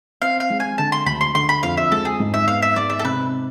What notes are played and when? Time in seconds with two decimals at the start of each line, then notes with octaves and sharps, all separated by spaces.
0.22 C4 F5
0.40 F5
0.50 G#3
0.60 G#5
0.78 D3 A5
0.92 C6
1.06 D2 B5
1.21 C6
1.35 D3 C6
1.49 B5
1.63 F2 F5
1.77 E5
1.92 G#3 A4
2.05 G#4
2.20 G#2
2.34 E5
2.48 B3 F5
2.62 E5
2.76 G#3 D5
2.90 E5
2.99 A4
3.04 C3 B4